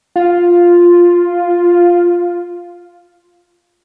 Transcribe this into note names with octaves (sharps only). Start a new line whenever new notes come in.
F4